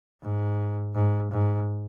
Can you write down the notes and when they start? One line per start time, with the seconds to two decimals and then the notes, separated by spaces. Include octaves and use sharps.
0.23 G#2
0.95 G#2
1.31 G#2